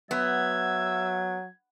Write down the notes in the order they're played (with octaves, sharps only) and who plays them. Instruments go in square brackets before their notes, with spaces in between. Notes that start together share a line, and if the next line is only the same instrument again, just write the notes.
[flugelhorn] F#3 [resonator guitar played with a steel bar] B3 [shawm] E5 [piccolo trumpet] G#6